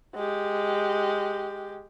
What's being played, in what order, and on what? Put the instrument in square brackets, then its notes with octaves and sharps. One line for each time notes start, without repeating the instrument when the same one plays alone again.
[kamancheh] G#3 G4